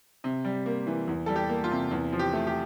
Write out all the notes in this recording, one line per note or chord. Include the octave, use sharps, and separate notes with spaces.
C3
G3
A#3
E3
E2
G3 A4
G4
A#3
F4
C3
E2
F3
G4
A3
G4